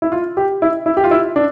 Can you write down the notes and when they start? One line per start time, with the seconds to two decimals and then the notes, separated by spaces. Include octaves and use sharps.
0.02 E4
0.12 F4
0.37 G4
0.62 E4
0.86 E4
0.97 G4
1.04 F4
1.11 E4
1.36 D4